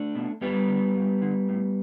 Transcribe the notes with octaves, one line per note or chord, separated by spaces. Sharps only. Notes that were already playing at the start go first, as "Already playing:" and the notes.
Already playing: A3 D4
B2
G2 G3 B3
D3
G2
D3
A2